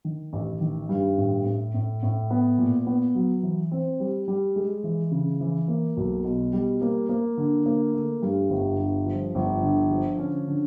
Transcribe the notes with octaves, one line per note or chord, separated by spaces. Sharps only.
D#3
A1
D#3
G2
A2
A2
A2
A2
B3
A#2
B3
F#3
E3
C4
G3
G3
G#3
E3
C#3
E3
A#3
B1
B2
G3
A#3
A#3
D3
A#3
A3
G2
G1
G2
F3
G1
D3
F3
C#4
D3